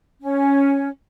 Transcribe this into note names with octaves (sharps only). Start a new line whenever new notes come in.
C#4